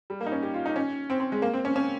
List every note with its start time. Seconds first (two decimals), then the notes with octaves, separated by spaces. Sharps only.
0.10 G3
0.21 A#3
0.26 D#4
0.32 C#4
0.43 G4
0.54 F4
0.66 D#4
0.76 C#4
1.10 C4
1.20 C4
1.32 G#3
1.42 A#3
1.53 C4
1.65 C#4
1.76 C#4